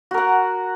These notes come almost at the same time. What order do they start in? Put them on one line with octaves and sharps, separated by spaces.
F#4 A#4 F#5